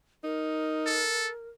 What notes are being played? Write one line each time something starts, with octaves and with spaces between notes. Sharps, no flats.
D#4 A#4
A4